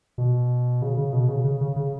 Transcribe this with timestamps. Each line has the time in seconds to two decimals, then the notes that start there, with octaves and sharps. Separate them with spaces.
0.18 B2
0.82 C#3
0.97 C#3
1.13 B2
1.28 C#3
1.44 C#3
1.61 C#3
1.76 C#3